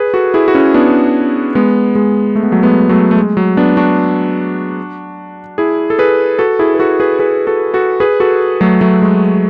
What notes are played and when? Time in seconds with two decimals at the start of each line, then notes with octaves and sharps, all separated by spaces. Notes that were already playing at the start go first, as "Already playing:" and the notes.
Already playing: G#4 B4
0.14 F#4 A4
0.34 E4 G#4
0.48 F#4
0.54 C#4 E4
0.74 B3 D4
1.55 G#3 B3
1.95 G#3
2.36 A3
2.43 B3
2.52 F#3 A3
2.63 G#3 B3
2.89 F#3 A3
3.11 A3
3.17 G#3
3.37 F#3
3.57 B3 D4
3.77 D4 F#4
5.58 E4 G#4
5.90 A4
5.99 G#4 B4
6.39 F#4 A4
6.59 E4 G#4
6.74 B4
6.79 F#4 A4
7.00 G#4 B4
7.19 G#4 B4
7.47 F#4 A4
7.74 F#4 A4
8.00 G#4 B4
8.20 F#4 A4
8.61 F#3 A3
8.81 F#3 A3
9.02 G#3